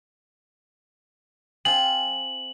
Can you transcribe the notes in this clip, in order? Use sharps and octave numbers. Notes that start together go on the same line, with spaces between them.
C4 F4 G#4 F#7